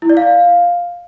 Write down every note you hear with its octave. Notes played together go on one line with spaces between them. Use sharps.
E4
D5
F5